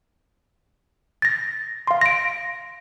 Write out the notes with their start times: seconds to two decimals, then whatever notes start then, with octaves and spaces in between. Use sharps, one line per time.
1.22 A6 A#6
1.87 F5 C6
2.01 A#6 D7